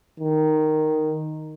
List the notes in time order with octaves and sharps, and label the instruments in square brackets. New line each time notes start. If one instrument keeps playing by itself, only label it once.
[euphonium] D#3